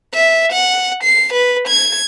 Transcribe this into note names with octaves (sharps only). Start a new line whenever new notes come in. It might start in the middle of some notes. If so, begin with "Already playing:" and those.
E5
F#5
C7
B4
G#6